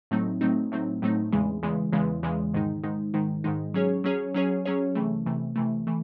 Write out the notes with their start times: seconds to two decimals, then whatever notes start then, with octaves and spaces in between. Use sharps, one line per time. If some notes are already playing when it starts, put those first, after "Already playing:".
0.11 A2 F#3 A3 C4 D#4
0.41 A2 F#3 A3 C4 D#4
0.72 A2 F#3 A3 C4 D#4
1.02 A2 F#3 A3 C4 D#4
1.32 E2 C#3 E3 G#3
1.63 E2 C#3 E3 G#3
1.92 E2 C#3 E3 G#3
2.23 E2 C#3 E3 G#3
2.54 G#2 D#3 G#3 D#4
2.83 G#2 D#3 G#3 D#4
3.14 G#2 D#3 G#3 D#4
3.44 G#2 D#3 G#3 D#4
3.74 F#3 C#4 G#4 C#5
4.04 F#3 C#4 G#4 C#5
4.34 F#3 C#4 G#4 C#5
4.66 F#3 C#4 G#4 C#5
4.95 C3 E3 A3
5.26 C3 E3 A3
5.56 C3 E3 A3
5.87 E3 A3